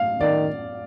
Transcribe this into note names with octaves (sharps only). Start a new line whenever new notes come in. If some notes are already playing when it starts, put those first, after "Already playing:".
Already playing: F5
D#3 D5